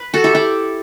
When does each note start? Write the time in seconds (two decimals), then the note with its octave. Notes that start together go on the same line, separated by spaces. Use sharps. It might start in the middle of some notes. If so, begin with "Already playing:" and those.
Already playing: B4
0.14 F#4 A4
0.24 E4 G4
0.35 E4 G4